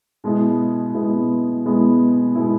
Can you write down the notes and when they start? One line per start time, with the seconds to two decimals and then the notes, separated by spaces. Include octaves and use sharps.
0.24 B2 G#3 B3 E4
0.94 B2 G#3 B3 E4
1.65 B2 G#3 B3 E4
2.35 B2 G#3 B3 E4